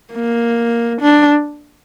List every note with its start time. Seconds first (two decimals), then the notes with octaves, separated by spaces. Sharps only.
0.14 A#3
1.01 D4